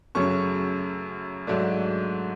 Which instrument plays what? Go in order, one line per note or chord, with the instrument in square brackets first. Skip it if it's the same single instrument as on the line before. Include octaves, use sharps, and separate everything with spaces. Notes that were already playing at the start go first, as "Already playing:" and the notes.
[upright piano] F#2 C#3 F#3 A3 C#4 C#6
G#2 F#3 A3 D4